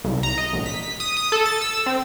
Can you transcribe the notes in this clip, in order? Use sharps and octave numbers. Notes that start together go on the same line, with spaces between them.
C2
A#5
D#5
A#1
B6
D#6
D#6
A4
A6
E6
C4